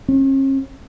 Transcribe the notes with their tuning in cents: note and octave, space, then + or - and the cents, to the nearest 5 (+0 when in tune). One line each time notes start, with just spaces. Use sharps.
C#4 -45